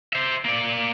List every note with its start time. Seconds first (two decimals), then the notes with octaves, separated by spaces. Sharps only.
0.13 C5 E5
0.45 A#3 D5